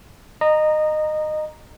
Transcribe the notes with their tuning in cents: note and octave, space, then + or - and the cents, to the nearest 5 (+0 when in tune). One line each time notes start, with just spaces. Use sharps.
D#5 -20 A#5 +0